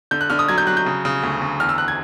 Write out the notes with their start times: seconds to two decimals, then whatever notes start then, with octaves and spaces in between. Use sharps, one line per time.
0.11 D3 G6
0.21 F#6
0.30 D3 F6
0.39 D#6
0.48 F#3 G#6
0.58 G6
0.67 F#3 F#6
0.77 G6
0.86 C#3
1.05 C#3
1.23 D2
1.42 D2
1.60 E2 F6
1.69 E6
1.78 F#6
1.88 G#6